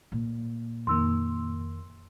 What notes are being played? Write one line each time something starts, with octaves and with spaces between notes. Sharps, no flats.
A#2
F2 D#3 A#3 C6 E6